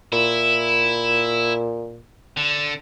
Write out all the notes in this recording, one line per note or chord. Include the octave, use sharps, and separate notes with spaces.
A#2 E4
D3